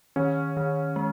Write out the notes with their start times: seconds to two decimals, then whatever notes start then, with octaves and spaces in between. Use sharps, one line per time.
0.16 D#3 C#4
0.57 D#3
0.96 G#3